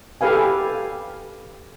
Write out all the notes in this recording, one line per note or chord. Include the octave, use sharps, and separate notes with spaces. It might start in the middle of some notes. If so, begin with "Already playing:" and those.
G4 A4 B4 F5 G#5